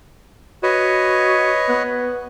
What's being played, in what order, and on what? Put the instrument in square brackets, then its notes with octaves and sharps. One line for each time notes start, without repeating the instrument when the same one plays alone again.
[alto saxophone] F#4 [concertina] B4 C#5 D#5
[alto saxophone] B3